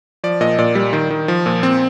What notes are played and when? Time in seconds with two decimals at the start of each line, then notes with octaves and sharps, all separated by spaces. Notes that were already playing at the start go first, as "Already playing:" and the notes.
0.24 F3 D5
0.41 A#2 D#5
0.59 A#2 D5
0.75 G3
0.93 D#3
1.10 D#3
1.28 F3
1.46 A#2
1.63 C4